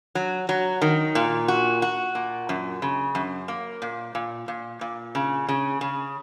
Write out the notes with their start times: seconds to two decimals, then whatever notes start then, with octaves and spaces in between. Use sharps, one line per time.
0.15 F#3
0.49 F#3
0.82 D#3
1.15 A#2
1.48 F#4
1.82 F#4
2.15 A#2
2.49 F#2
2.82 C#3
3.15 F#2
3.48 A#3
3.82 A#2
4.15 A#2
4.48 A#2
4.81 A#2
5.15 C#3
5.48 C#3
5.81 C#3